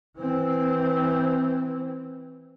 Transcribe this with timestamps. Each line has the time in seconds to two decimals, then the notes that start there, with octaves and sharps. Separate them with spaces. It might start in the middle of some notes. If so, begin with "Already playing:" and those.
0.18 E3 C4